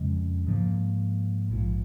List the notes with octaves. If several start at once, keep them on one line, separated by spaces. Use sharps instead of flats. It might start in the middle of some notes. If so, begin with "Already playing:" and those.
Already playing: F2 C#3 G#3
G#2 F3 A#3
A#1 G#2 F3